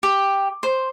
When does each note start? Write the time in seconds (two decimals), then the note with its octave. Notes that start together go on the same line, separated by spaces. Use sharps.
0.03 G4
0.63 C5